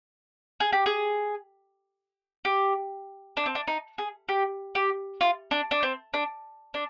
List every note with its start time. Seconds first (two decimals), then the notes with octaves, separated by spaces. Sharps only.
0.60 G#4
0.73 G4
0.86 G#4
2.45 G4
3.37 D4
3.46 C4
3.55 D4
3.68 D#4
3.98 G#4
4.29 G4
4.75 G4
5.21 F4
5.51 D4
5.71 D4
5.83 C4
6.14 D4
6.74 D4